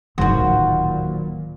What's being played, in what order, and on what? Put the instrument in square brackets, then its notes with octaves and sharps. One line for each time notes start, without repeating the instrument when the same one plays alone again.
[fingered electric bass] D1 C#2 [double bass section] A#2 [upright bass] D#3 F#3 [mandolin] F#4 B4 C5